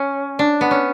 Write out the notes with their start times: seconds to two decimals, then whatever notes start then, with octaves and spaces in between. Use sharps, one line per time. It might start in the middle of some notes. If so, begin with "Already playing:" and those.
Already playing: C#4
0.39 D4
0.61 B3
0.71 C#4